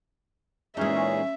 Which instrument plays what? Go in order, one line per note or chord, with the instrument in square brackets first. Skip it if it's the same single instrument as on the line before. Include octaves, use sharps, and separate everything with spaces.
[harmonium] A#2 E3 G#4 [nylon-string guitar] G#3 D#4 [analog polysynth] C#4 [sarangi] E5